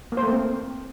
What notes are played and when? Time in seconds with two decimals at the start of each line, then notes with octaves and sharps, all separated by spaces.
0.12 A#3
0.17 C5
0.22 A3
0.27 A#3
0.32 C4